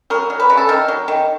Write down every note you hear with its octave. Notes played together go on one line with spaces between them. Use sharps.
F#3 A#4
F#3
B4
C#3
A4
D#3 A#4
F#3
D#3